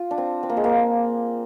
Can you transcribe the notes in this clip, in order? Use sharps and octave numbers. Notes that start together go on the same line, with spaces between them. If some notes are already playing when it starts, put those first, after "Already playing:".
Already playing: F4
D4
C4
C4
A#3
G#3
A#3